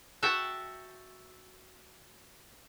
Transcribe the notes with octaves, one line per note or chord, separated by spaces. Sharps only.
F#4 A4 E5 F#5 G5